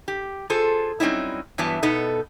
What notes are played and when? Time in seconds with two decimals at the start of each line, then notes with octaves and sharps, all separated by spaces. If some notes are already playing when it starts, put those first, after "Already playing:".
0.08 G4
0.50 F4 G#4 A4 C5
1.00 F#3 G3 C4 C#4 D#4 E4
1.58 G2 E3 F#3 B3 A5
1.82 B2 B3 D#4 A4